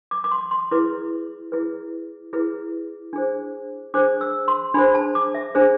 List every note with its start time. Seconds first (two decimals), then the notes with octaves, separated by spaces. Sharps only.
0.11 D6
0.24 D6
0.31 C6
0.51 C6
0.71 E4 G#4 B4 D6
1.52 E4 G#4 B4
2.33 E4 G#4 B4
3.13 D4 G#4 C5
3.94 D4 G#4 C5 D6
4.21 E6
4.48 C6
4.74 D4 B5
4.77 G#4 C5
4.95 A5
5.15 D6
5.35 E5
5.55 D4 G#4 C5